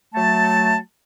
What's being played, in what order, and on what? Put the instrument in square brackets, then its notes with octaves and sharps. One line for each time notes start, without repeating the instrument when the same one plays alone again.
[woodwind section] F#3 A3 A5